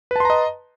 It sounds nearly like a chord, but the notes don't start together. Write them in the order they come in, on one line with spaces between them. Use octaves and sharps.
B4 A5 C6 A#5 D#5